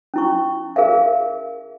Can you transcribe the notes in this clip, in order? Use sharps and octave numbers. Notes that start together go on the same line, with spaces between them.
C#4 E4 C#6
G#4 A#4 E5 F5